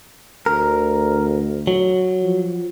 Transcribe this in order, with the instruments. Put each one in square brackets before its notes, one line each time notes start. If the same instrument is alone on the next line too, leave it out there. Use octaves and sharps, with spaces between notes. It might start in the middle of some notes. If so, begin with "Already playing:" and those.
[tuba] D2 [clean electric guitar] A#4
[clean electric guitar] F#3
[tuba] F3